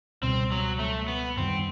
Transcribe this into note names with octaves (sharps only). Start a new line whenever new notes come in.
C#2 B2 G3 C4
F#3
A3
B3
F#2 D#3 G3 C4